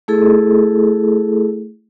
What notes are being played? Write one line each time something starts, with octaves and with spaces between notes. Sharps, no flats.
A3 E4 G#4 A4